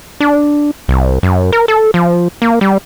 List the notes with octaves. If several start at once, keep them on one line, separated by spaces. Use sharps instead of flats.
D4
C2
F#2
A#4
A4
F3
A#3
G3